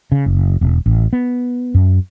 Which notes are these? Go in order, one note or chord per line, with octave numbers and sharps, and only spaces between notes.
C#3
F#1
E1
A1
B3
F#2